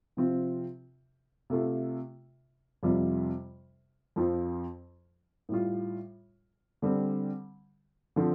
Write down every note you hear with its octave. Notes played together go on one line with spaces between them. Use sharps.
C3 F3 C4 F4
C3 A3 F4
F2 C3 G3 F4
F2 F3 C4 F4
A2 G3 F4
D3 G3 C4
D3 F3 C4 F4